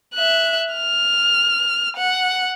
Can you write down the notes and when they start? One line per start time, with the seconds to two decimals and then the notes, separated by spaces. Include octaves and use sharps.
0.14 E5 F#6
0.74 F6
1.97 F#5